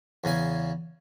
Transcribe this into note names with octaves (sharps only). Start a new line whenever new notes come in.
E2 C#3 G#5